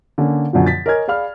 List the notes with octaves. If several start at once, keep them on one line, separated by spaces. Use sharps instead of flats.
D3 A#3 C#4
F#2 B2 D3 F3
A6 B6
A#4 C#5 D#5 G#5 F6 G#6
G#4 D5 F5 B5 F6